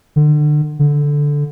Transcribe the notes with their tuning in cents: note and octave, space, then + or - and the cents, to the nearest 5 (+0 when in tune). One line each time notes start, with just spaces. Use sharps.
D3 +30
D3 -10